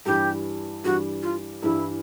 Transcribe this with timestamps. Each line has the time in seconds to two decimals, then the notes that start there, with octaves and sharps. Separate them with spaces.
0.06 G2 E3 G3 G4
0.84 G2 E3 G3 F#4
1.23 F4
1.62 G2 E3 G3 E4